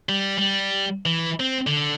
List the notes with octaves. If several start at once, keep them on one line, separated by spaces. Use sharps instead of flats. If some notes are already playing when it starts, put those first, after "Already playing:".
G3
G3
E3
C4
D3